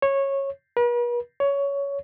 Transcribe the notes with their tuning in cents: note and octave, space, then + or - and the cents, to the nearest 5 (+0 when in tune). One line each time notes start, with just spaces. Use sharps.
C#5 -15
B4 -45
C#5 +15